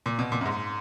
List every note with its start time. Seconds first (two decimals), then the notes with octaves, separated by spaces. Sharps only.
0.06 A#2
0.19 B2
0.32 A#2
0.41 F#2
0.46 G#2